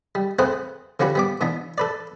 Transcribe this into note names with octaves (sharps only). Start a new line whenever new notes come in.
G3
A3 C4 G#4 B4 C5 F#5
D3 F3 C#4 F#4 G4 B4
G3 B3 D6
B2 E3 B3 D4
A4 B4 D5